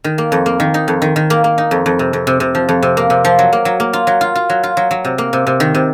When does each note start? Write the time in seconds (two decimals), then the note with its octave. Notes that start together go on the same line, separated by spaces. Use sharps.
0.04 D#3
0.18 A#3
0.32 F2
0.46 A#3
0.60 D#3
0.74 D#4
0.88 F2
1.02 D#3
1.16 D#3
1.30 A#3
1.44 A#3
1.58 D#4
1.71 F2
1.86 F2
1.99 C3
2.13 F2
2.27 C3
2.40 C3
2.55 F3
2.69 F2
2.83 C3
2.97 A#3
3.10 C3
3.25 F3
3.39 F#3
3.53 A#3
3.65 F#3
3.80 A#3
3.93 F4
4.07 F#3
4.21 F4
4.35 F4
4.50 F#3
4.63 F4
4.77 F#3
4.91 F#3
5.05 C3
5.18 A#3
5.33 C3
5.47 C3
5.60 D#3
5.75 C3